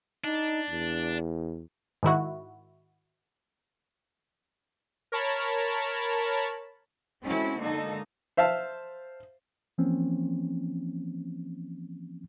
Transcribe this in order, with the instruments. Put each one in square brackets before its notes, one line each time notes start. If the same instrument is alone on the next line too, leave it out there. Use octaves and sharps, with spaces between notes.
[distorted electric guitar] D4 [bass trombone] D#4
[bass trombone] E2
[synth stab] G#2 D#3 E4 F#4
[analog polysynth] A#4 C#5 A5 B5
[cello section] G#3 C4 C#4 E4 F#4 A4
D3 G#3 A#3 D#4 A4
[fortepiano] C5 E5 F5 A5
[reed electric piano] E3 F3 A#3 C4 C#4